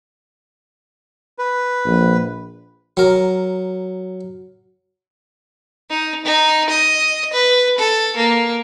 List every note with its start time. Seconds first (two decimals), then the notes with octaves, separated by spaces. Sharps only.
1.39 B4
1.85 A#1
2.97 F#3 A#4
5.90 D#4
6.25 D#4
6.70 D#5
7.33 B4
7.78 A4
8.16 A#3